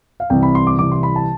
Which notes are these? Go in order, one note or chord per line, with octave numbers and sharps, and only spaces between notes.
F5
C2 C3 E3 G5
B5
C6
D6
C2 C3 E3 D6
C6
B5
A5